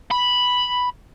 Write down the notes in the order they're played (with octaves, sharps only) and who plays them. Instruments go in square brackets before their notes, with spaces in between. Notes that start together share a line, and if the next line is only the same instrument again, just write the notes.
[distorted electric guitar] B5